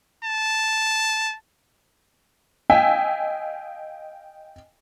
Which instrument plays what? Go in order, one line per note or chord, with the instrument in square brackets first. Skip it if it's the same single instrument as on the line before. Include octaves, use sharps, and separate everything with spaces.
[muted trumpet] A5
[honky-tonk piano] D#5 F5 G5 G#5 E6 B6